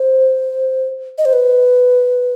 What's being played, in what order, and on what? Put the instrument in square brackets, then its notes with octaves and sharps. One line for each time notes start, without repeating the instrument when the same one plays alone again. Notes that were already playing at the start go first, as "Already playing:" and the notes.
Already playing: [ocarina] C5
D#5
C5
B4